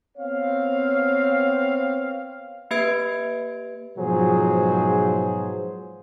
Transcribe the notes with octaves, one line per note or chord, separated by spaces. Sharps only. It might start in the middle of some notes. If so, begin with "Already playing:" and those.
B3 C4 C#5 F5
A#3 G4 B4 E5 G#6 D7
G#2 B2 F3 F#3 G#4 C5